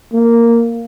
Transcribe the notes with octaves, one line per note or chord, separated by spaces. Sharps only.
A#3